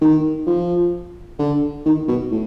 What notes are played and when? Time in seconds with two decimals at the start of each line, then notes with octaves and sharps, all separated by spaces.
0.01 D#3
0.47 F3
1.39 D3
1.86 D#3
2.08 B2
2.31 A2